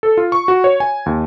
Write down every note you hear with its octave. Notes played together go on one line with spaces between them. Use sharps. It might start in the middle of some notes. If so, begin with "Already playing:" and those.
A4
F4
C#6
F#4
C#5
G#5
D#2